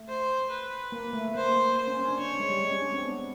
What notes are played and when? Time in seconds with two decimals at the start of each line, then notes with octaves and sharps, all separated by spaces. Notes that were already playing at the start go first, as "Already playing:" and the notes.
Already playing: A3
0.09 C5
0.50 B4
0.92 A#3
1.13 A3
1.35 A#3 C5
1.56 A#3
1.77 C5
1.87 C#4
1.98 C#4
2.08 D4
2.18 C#4 C#5
2.40 G#3
2.50 G3
2.61 G#3
2.71 C#4
2.82 D4
2.93 C4
3.03 B3